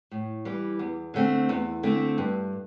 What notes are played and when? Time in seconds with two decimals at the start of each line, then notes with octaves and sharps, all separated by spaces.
0.11 A2
0.45 E3 G3
0.79 E2
1.14 D3 A3 C4
1.49 E2
1.83 D3 A3 C4
2.18 G2